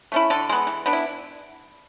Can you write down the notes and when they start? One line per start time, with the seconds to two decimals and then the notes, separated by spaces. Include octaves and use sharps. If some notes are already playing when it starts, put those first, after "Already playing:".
0.12 A3 C#4 E4
0.30 D3 A4
0.49 G#3 B3
0.67 E3
0.86 B3 D4
0.93 E4